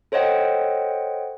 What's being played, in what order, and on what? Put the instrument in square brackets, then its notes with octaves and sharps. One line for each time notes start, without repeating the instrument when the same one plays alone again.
[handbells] A4 C5 C#5 D#5 F#5 G5